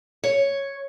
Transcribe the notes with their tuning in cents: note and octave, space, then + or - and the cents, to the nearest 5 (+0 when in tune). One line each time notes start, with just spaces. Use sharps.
C#5 +0